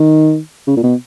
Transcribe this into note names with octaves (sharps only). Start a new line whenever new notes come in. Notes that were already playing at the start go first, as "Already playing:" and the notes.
Already playing: D#3
C#3
A#2
B2